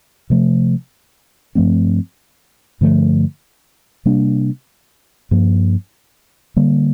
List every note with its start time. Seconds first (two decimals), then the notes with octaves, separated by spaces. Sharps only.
0.30 C3 F3 A3
1.55 G2 F3 A3 C4
2.81 G2 D3 F3 A3
4.05 C3 G3 A#3 D4
5.31 G2 F3 A#3
6.56 D3 G3 A#3